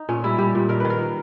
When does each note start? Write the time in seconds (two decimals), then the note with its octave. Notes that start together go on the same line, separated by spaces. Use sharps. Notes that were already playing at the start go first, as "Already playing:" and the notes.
Already playing: D#4
0.09 A#2 C#4
0.24 G3 E4
0.38 G3 G4
0.55 A#2
0.69 D#3 A#4
0.80 D#3 B4
0.90 A#4